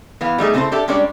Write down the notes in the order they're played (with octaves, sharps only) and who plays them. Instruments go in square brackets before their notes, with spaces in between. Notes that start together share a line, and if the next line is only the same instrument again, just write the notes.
[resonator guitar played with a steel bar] E3 B3 F5
G3 A3 D#4 G#4
C#3 B3 C4 E4 A4 C5
D4 G4 A4 E5
G3 G#3 C#4 D4 C#5 D5